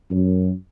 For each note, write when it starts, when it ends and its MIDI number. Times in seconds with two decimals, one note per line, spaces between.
0.11 0.51 42